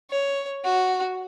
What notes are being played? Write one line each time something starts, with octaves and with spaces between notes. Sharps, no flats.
C#5
F#4